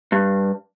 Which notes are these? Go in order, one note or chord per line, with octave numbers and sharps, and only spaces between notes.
G2